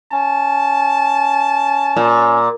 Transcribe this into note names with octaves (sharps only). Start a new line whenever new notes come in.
C#4 A5
A#2